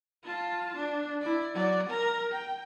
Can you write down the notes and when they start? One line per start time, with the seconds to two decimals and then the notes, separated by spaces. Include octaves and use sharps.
0.23 F4 A5
0.76 D4
1.21 E4 D5
1.54 F#3 D5
1.89 A#4 A#5
2.32 G5